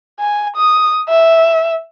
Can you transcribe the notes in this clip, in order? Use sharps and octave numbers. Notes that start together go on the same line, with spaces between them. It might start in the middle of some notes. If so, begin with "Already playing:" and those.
G#5
D#6
E5